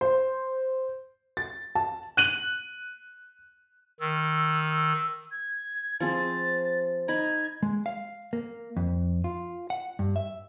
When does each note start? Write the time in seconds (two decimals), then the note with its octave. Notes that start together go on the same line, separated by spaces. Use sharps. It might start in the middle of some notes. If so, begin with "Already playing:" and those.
0.01 C5
1.37 A6
1.75 A5
2.17 F#6 D#7 F#7
4.00 D#3 E6
4.70 E6
5.31 G#6
6.00 F3 C4 G#4 A6
7.08 D#4 B5 G#6
7.63 G#3
7.86 F5
8.33 A#3
8.77 F2
9.24 F4
9.70 F#5
9.99 G2
10.16 E5